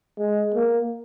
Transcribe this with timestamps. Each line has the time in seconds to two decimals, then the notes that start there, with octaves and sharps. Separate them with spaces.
0.19 G#3
0.54 A#3